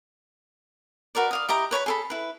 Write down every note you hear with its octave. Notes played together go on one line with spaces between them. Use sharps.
F#4 A#4 B4 D5
D5 F5 D#6
E4 G4 D#5 A#5
B4 C#5 D5 B5
G#4 A4 B5
E4 B4